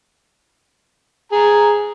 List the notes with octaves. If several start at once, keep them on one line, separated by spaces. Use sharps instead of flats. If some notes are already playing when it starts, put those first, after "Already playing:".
G#4 A#5